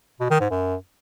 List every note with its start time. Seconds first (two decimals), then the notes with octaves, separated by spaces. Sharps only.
0.20 B2
0.30 D#3
0.40 G#2
0.50 F#2